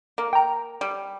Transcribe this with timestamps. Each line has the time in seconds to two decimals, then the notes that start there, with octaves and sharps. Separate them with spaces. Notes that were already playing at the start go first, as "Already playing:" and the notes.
0.18 A#3
0.33 G5 A#5
0.81 G3